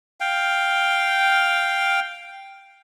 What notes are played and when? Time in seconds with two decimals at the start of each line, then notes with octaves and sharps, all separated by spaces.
0.20 F5 G5